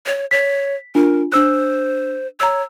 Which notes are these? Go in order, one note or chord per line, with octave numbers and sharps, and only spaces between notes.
C#5
C#5 B6
D4 F4 A#4
D4 C5 E6 F#6
C#5 A#5 E6